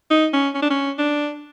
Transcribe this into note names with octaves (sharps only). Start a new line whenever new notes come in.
D#4
C#4
C#4
D4
C#4
D4